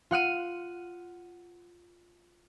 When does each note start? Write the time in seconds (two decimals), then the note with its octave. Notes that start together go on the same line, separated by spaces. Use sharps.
0.11 F4 F#5 F6 D#7